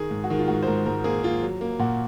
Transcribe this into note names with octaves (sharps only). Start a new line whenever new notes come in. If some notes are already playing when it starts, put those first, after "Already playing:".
Already playing: D#3 G#4
G#2
F#4
D#3 G#4
F4
G#2 F#4
C5
G#2 A#4
G#2 A#4
A#3 G#4
A#3 F4
F#3
A#3
A#2 F#4